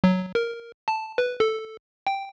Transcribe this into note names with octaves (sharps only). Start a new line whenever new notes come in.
F#3
A#4
A5
B4
A4
G5